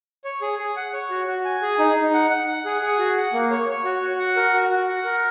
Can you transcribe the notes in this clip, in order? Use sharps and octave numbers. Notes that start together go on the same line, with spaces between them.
C#5
G#4
G#4
F#5
C#5
F#4
F#4
G#5
G#4
D#4
D#4
F#5
F#5
F#5
G#4
G#4
F#4
F#5
A#3
C#5
C#5
F#4
F#4
F#5
A#4
F#4
F#4
F#5
A#4